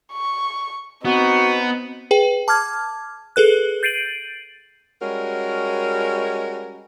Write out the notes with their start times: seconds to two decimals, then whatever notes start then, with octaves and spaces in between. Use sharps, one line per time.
0.13 C#6
1.05 B3 C4 D#4 F#4
2.11 G#4 B4 G5
2.48 A5 D6 F6 G#6
3.36 G#4 A4 B4 F#6
3.83 G6 A6 C7 D7 D#7 F#7
5.02 G3 G#3 C#4 F#4 A#4